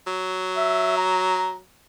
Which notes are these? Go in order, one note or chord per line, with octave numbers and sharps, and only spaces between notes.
F#3
E5
A#5